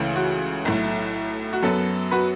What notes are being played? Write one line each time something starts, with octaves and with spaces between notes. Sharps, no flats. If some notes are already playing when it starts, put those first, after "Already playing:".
Already playing: C#2 C#3 E3 A3
F#4
B1 A2 A3
F#4
F#2 F#3 B3 A4
F#4 B4